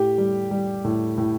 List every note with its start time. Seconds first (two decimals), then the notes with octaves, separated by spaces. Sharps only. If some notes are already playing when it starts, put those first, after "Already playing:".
Already playing: A2 G4
0.18 G3
0.51 G3
0.84 A2
1.18 A2